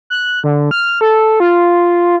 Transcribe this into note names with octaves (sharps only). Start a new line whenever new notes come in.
F#6
D3
F6
A4
F4